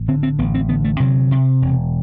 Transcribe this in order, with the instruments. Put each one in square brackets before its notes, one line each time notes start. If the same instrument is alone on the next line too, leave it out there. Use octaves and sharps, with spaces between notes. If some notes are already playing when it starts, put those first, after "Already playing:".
Already playing: [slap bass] A1
D3 C4
C4
A1 B3
C4
D3 B3
A3
C3 F#3
C3
E1